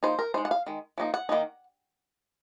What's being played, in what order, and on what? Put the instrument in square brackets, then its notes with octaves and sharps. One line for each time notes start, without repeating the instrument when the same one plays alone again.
[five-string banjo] F3 A#3 D#4 C5
A#4
G#3 D#4 C5
F#5
F5
D#3 G#3
F3 A#3 D#4
F#5
D#3 A#3 D#4